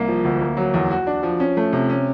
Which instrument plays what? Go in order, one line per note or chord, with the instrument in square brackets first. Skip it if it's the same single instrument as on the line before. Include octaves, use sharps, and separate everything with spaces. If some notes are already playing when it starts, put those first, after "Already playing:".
Already playing: [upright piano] C2 A#3
F3
D2
A#3
F#3
E2
F#4
D4
F3
C#4
A3
C3
C#4